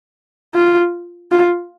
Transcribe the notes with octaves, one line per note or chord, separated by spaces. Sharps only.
F4
F4